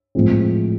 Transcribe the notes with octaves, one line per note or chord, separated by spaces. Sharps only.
A2 F3 G#3 C4